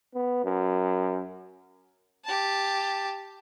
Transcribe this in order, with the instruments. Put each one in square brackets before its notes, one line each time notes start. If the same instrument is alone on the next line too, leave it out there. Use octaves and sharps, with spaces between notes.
[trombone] B3
F#2
[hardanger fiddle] G4 A5